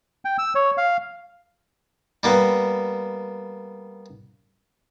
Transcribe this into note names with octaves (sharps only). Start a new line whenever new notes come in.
G5
E6
C#5
F5
G3 A#3 B3